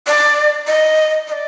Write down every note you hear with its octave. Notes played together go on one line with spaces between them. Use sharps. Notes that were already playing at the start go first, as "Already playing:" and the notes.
D5
D#5
D#5
D5